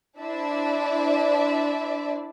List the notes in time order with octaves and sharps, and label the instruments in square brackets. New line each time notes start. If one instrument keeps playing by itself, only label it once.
[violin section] D4 E4 C5 D5 E5